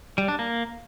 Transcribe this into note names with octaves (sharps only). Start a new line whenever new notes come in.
G3
D4
A#3